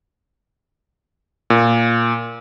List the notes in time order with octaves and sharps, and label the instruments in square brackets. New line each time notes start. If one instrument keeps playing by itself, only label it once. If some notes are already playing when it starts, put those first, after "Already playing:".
[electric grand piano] A#2